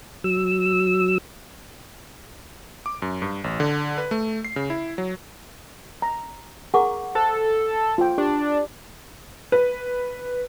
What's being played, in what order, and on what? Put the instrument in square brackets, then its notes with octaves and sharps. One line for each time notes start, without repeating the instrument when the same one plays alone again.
[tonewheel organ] F#3 E6
[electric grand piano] D6
F#2
G2
A1
D3
B4
A3
C7
C#3
E4
F#3
[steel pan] A#5
[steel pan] G#4 A#4 [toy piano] F#5 C#6 D6
[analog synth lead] A4 [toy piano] C5
[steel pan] F4 G5
[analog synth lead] D4 [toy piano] G4
[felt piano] B4